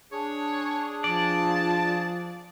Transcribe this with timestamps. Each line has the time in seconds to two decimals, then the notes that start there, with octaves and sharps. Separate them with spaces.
0.12 D4 G#4 C#5
1.04 F3 D5 A5